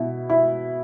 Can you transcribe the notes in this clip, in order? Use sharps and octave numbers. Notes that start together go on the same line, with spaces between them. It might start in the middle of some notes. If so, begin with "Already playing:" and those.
Already playing: B2 E4
E4